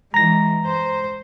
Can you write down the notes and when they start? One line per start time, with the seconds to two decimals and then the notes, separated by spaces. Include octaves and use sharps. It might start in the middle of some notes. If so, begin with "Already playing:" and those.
0.14 E3 G#3 A#5 A#6
0.67 C5